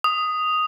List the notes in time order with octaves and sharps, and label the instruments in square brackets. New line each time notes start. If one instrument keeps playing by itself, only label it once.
[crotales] D#6